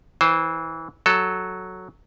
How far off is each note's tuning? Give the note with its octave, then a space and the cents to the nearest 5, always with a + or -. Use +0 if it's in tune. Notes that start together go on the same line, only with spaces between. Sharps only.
E3 -20 C5 +0
F#3 +0 A4 +0